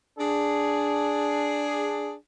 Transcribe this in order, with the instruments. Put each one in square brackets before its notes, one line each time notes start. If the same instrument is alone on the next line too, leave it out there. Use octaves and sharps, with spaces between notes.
[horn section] D4 G#4